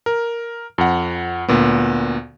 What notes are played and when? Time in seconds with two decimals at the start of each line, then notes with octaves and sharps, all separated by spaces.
0.06 A#4
0.78 F2 F#5
1.48 D2 A#2 B3